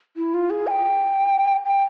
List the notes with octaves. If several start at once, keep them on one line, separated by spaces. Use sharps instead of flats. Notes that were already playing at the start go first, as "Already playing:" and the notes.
E4
F4
G#4
G#5
G5
G5